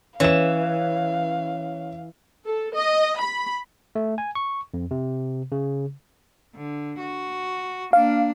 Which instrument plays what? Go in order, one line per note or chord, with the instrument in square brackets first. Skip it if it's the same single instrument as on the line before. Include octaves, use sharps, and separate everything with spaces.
[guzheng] E3 [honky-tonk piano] C#4 E7 [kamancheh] F5
[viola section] A4
D#5
B5
[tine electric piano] A3
G#5
C#6
F2
C3
C#3
[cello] D3
F#4
[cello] A#3 D4 [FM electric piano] F5